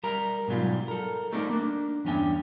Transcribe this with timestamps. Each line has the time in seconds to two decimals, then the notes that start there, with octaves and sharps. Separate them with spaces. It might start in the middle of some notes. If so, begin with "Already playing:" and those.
0.04 G3 A#4 A#5
0.48 G#2 B2 F#3 G3 F4
0.88 A4 A#4
1.32 G3 A3 C4 D#4 A#4 D5
1.49 A#3 D4
2.05 E2 G2 C#4 D4 G5